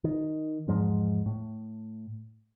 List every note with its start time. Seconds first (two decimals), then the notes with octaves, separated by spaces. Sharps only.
0.04 D#3
0.67 E2 G#2 F3 G#3
1.26 A2